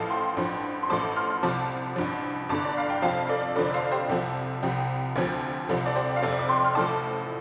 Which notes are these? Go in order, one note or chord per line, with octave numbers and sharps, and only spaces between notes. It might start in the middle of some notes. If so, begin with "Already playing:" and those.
Already playing: A1 A2 F3 F5 A5
G5 C6
A1 G2 F3
C6
A1 A2 F3 A5 D6
C6 F6
C2 C3 F3 A5 D6
A1 G2 F3
G1 G2 D3 A5 D6
D5
F5
G5
F1 F2 F3 F5 A5
A4 D5
F1 F2 D3 F3 A4 D5
C5 F5
G4 C5
C2 C3 F3 A4
C2 C3 F3 G4
D2 C3 F3
C2 C3 F3 A4
D5
G4 C5
F5
F1 F2 C3 A4 D5
D6
G5 C6
F6
A1 A2 F3 A5 D6